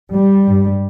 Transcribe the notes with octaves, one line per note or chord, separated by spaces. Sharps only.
G3
G2